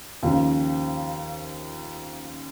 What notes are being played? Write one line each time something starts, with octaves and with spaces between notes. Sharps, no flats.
D#2 C#3 F3